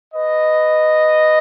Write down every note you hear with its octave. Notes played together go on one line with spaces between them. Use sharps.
B4 D#5